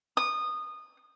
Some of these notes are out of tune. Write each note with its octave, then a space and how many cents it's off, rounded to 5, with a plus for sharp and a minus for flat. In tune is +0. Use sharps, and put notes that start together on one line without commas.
D#6 -20